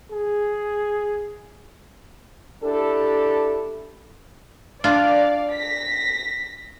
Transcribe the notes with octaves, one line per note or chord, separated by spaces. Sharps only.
G#4
D4 E4 G4 A4
D4 F4 D5 F5
A#6 B6